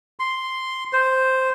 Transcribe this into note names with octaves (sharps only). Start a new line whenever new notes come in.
C6
C5